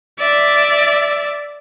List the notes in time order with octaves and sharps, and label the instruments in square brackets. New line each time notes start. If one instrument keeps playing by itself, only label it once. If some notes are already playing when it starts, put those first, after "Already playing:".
[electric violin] D5 E5